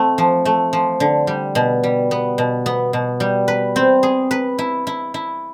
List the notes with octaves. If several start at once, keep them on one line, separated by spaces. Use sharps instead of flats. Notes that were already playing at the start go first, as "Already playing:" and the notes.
Already playing: A3 C4
F3
A3
F3
D3
G3
B2
G3
B3
B2
B3
B2
G3
B4
C4
G#4
B4
E4
E4
E4